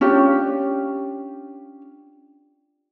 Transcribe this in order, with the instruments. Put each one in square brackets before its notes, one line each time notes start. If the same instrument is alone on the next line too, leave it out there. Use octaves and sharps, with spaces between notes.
[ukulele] C#4 D4 F4 G4